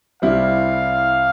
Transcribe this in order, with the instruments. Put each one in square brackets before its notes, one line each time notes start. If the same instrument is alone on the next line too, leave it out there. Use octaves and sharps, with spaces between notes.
[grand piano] C2 C3 G3 C4 E4 [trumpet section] F5